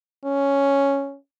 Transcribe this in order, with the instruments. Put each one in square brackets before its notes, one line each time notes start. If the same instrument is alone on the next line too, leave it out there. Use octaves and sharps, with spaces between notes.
[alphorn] C#4